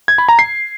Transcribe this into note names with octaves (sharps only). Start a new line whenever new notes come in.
G#6
B5
A#5
C7